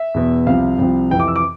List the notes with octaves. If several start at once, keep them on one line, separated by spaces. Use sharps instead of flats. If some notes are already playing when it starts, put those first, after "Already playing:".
Already playing: E5
E2 B2
C2 C3 F3 F5
C2 C3 F3
F2 C3 E3 G5
D6
E6
D6